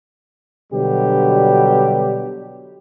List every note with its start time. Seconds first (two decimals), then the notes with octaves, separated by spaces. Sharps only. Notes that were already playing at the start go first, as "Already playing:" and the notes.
0.73 B2 D3 F#3 G3 G4